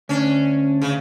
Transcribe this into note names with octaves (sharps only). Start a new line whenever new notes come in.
D2 C#4 D4
C#3